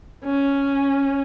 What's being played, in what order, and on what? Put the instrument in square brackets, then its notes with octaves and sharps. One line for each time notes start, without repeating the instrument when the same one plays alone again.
[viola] C#4